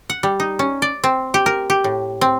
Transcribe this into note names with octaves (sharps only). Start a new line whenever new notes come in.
F#5
G3
D#4
C#4
D5
C4
G4
A#4
G4
A2
C4